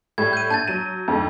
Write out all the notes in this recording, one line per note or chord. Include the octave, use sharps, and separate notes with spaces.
A2 G3 G#6
G6 D#7
A#1 A5 G6 A6
F#3 D#7
F2 G#2 D3